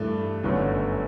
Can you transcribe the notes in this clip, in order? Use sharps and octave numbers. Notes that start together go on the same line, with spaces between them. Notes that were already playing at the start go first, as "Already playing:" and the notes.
Already playing: G2 E3 A3
G1 F#2 D3 A3 C#4